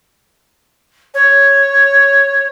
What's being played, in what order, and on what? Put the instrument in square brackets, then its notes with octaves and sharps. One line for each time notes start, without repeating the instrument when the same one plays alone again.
[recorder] C#5